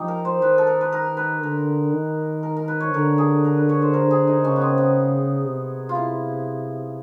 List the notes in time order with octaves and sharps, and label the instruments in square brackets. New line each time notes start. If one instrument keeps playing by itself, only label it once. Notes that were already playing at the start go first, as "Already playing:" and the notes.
Already playing: [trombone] F3 [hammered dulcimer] D#4 G4
[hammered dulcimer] A#4
C5
[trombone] D#3 [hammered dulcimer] B4
[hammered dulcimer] A4
A#4
B4
A#4
B4
[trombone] D3 [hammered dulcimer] A#4
[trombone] D#3
[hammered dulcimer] A#4
A#4
B4
C#5
[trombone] D3 [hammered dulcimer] A#4
[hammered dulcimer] G#4
A#4
B4
C#5
C5
A#4
G#4
D#4
[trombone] C#3 [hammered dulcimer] C#4
[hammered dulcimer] B3
C4
B3
[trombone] C3
[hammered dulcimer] F4
E4